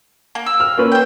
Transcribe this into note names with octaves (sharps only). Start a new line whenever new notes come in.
A#3
E6
F6
A#3 C#4 B4
C5 G5